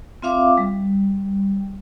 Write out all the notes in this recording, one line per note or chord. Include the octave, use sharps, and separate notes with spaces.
C4 F4 E5 F5 D6
G3